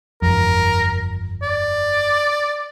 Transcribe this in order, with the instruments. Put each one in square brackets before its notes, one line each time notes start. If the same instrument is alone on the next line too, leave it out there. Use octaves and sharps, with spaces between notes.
[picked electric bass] G1 F2 [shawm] A#4
[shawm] D5